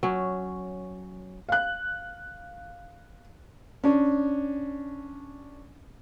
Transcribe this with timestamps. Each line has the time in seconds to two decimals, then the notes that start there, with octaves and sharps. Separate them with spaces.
0.03 F#3 C#4
1.49 F5 F#6
3.84 C#4 D4